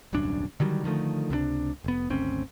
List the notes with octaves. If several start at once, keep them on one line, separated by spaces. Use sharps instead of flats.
D#1 C2 F#2 D4
D3 D#3 F#3 G3
D3 D#3 F3 A3
C#2 C3 G3 D4
F1 B3
G#1 D2 C4 C#4